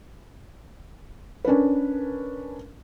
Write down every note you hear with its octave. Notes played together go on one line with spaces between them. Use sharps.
C#4 D4 A#4 B4